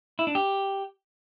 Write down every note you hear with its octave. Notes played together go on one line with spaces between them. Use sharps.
E4
D4
G4